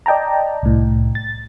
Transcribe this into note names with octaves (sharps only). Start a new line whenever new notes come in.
D5 D#5 G5 A5 A#5
C2 A2
A6